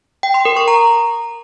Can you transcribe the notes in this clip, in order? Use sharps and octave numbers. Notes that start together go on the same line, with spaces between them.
G5
C6
A#4
C#6
A#5